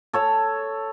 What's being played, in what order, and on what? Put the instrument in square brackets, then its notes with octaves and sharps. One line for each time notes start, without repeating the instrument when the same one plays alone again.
[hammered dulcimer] A4 C#5 A5